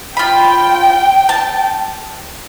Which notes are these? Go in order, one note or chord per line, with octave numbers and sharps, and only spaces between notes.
F4 G5 B5
A5